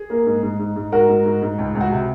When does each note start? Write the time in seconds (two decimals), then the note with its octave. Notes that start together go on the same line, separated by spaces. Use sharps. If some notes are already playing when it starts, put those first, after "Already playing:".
Already playing: G#4
0.10 A#3
0.26 G#2
0.43 G#2
0.59 G#2
0.76 G#2
0.92 G#2 F#4 A#4
1.09 G#2
1.25 G#2
1.42 G#2
1.58 C#2
1.75 C#2
1.81 F#4
1.92 C3